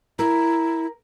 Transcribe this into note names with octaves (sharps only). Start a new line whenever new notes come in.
E4 A#4